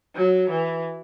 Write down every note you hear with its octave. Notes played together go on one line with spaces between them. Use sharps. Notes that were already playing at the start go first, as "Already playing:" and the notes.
F#3
E3